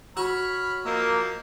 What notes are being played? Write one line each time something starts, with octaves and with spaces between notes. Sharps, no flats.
F#4 C#5 B5 F6
F3 A#3 D#5 E6